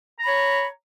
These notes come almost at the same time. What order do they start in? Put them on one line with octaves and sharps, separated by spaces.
A#5 B5 C#5